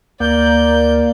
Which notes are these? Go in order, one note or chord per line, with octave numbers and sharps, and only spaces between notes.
D2 A#3 D5 G6